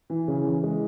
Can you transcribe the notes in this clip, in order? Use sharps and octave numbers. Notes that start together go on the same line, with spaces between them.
E3
C#3
E3
G#3